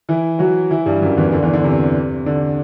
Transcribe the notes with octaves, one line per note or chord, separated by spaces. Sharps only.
E3 E4
F#3 F#4
E3 E4
G2 G3
F#2 F#3
E2 E3
D3
E2 E3
D3
C3
D3